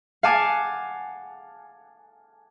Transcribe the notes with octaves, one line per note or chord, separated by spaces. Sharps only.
F5 F#5 G#5 A5 D6